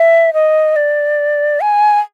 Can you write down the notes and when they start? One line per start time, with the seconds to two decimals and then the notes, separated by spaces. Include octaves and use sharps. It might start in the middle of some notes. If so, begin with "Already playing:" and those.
Already playing: E5
0.34 D#5
0.76 D5
1.61 G#5